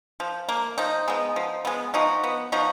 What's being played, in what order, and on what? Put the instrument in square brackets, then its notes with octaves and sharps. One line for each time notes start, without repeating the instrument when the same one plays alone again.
[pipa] F3
A#3
F3 D#4
G#3 B3
F3
G#3 B3
F3 D#4 F#4
B3
F3 D#4 F#4